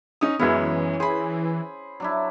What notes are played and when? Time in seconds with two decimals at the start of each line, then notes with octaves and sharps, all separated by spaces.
0.21 C#4 D#4 D#6
0.39 F#2 E3 G#3 B3 C#4 E4
1.00 G#4 C5 B5
2.00 F#3 D4 E4